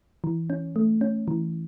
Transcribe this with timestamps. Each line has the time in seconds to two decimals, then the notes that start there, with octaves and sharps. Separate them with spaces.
0.24 E3
0.50 C#4
0.76 A3
1.01 C#4
1.28 E3